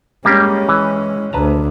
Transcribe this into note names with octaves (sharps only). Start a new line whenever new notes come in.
G3 G#3 A#3 C#4 G4
E3
D2 B4 A5 A#5